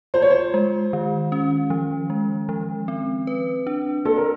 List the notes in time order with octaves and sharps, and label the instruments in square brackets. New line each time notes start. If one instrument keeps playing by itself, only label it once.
[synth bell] F4 [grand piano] C5
[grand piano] C#5
C5
[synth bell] G#3
D#3
C#4
F3
G#3
F3
C4
B4
D4
[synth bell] A#3 [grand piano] A4
[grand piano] A#4